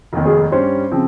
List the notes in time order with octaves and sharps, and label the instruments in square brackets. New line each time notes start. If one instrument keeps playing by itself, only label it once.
[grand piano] F1 D#2 D#3
[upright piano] G#4
[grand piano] G2 G3 C#4 [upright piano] C5
[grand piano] C#3 F3 C4